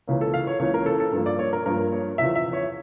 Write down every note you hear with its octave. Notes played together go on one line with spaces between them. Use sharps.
C#2 C#3 E3 A#3 C#4
A4
F5
C#5
C#2 C#3 E3 A#3 C#4 C#5
A#4
A4
A4
G2 F3 A#3
D5
C#5
A#4
G2 F3 A#3 A#4
C#5
E2 C#3 F3 E5
E5
C#5